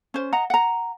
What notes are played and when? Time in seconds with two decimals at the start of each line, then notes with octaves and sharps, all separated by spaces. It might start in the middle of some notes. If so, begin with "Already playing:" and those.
0.14 C#4 C5
0.32 D#5 F#5 A#5
0.50 F#5 A#5